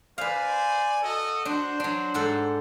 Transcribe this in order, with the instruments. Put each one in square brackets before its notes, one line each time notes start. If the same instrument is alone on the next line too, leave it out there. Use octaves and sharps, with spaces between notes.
[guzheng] B4 F5 [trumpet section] C5 D5 G#5
[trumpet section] F#4 A4 D#5
[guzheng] D4 [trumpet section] F#4 C5
[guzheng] F#3 D4
G#2 A4 F#5